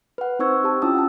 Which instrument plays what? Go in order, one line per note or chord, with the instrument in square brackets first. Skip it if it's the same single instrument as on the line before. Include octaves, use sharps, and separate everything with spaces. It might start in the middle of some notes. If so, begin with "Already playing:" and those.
[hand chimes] B4 F#5
C4 D#4 C5 C#6 E6 G#6
G4 A5
C#4 E4 F4 A5 D#6 E6
F#5 A5